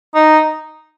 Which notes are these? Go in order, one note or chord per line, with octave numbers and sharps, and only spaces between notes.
D#4